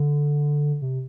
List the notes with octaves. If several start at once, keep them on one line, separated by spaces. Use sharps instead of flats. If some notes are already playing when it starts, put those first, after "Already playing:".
Already playing: D3
C3